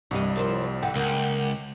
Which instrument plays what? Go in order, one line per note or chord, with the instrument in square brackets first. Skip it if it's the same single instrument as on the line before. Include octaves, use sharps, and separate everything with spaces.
[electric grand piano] C2 G3 [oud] G2 E3 D#5
[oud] F3 A#4 C5
[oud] D3 E3 [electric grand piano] F#5 G5
[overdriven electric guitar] C#2 [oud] A#3